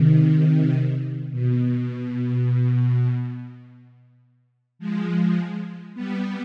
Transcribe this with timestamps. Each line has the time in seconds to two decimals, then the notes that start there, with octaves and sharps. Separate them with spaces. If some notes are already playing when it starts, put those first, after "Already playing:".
Already playing: C3 D#3
0.17 C3
1.32 B2
4.79 F3 G#3
5.94 G3 B3